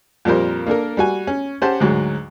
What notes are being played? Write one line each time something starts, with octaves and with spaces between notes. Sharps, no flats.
F2 A#2 G3 A#4 C5
A#3 D4 A4 A#4
G3 F#4 G#5
C#4
C#4 G4 C5 F#5 A5
D2 G#2 F#3